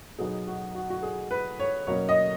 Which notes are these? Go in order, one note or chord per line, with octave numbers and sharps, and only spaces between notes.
B2 F#3 B3 D#4 G#4
F#4
F#4
F#4
G#4
B4
C#5
B2 F#3 A#3 C#4 C#5
D#5